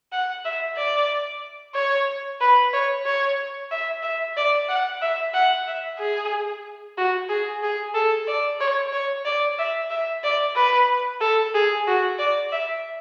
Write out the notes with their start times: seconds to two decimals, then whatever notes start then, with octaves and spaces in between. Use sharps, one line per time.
0.12 F#5
0.45 E5
0.77 D5
1.74 C#5
2.41 B4
2.73 C#5
3.06 C#5
3.71 E5
4.03 E5
4.37 D5
4.69 F#5
5.02 E5
5.33 F#5
5.67 E5
5.99 G#4
6.97 F#4
7.29 G#4
7.63 G#4
7.94 A4
8.27 D5
8.60 C#5
8.93 C#5
9.25 D5
9.59 E5
9.91 E5
10.24 D5
10.56 B4
11.21 A4
11.54 G#4
11.87 F#4
12.19 D5
12.52 E5